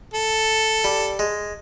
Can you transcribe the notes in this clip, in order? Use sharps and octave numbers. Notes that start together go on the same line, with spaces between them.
A4
G3
G#3